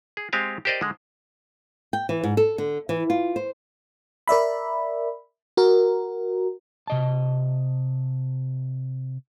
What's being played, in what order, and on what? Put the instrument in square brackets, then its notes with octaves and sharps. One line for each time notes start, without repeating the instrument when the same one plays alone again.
[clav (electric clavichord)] G#4
G#3 C4 G4 F5 G#5
G4 A#4 C5 D5 D#5
D3 G#3
[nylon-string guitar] G5
E3
G#2
A4
D3
E3
F4
C5
[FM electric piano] A#4 D5 E5 B5
F#4 A#4
[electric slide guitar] C3 D#5 A5